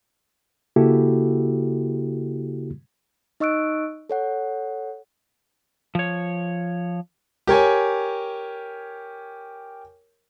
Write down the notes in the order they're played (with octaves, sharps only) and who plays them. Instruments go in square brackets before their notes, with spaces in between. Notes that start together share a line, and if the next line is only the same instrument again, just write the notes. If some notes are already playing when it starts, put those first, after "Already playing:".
[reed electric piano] C#3 A#3 E4 F#4 G4 A4
[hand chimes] D#4 D#5 C#6 E6 F#6 D7
A4 C#5 F#5
[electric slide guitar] F3 C#5
[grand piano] G4 A#4 C#5 G#5